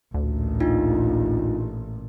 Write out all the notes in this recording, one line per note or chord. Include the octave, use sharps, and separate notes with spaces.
A1 D2 A#2
D4 D#4 F4